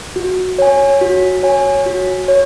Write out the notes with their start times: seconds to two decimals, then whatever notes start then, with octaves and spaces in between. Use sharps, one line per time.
0.16 F#4
0.58 C#5 G#5
1.01 F#4
1.43 C#5 G#5
1.86 F#4
2.28 C#5